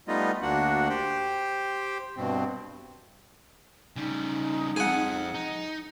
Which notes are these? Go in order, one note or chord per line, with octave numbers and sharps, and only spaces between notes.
G3 A3 B3 D#4 F4 D#5
D2 A#3 D4 F#4 F#5
G4 C5 G5
G2 B2 C4
C#3 G3 D#4
F2 G#4 F#5
D#4